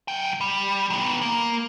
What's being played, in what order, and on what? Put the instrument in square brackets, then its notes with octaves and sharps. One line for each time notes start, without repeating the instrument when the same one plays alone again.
[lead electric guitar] F#3 G5
G3
D#3 B3
A#3